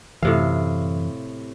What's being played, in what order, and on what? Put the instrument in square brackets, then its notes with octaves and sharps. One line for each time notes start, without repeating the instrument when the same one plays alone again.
[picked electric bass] F#2 E3 [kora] A2 C3 F5